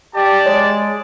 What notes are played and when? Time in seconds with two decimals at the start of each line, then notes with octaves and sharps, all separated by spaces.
0.15 G4 D5 A5
0.46 G#3 C#5